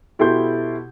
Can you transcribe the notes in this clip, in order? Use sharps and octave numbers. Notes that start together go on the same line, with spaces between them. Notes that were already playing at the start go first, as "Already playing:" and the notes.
B2 E4 G4 A4 C6 G6